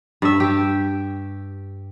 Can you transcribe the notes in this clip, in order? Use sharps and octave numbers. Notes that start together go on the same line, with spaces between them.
G2 E5
G4